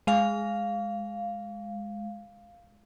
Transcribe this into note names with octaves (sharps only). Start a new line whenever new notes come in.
G#3 F5